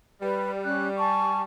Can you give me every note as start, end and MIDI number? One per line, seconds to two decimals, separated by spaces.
0.21 1.44 55
0.21 0.49 71
0.62 0.87 61
0.62 0.87 90
0.97 1.42 80
0.97 1.42 81
0.97 1.42 85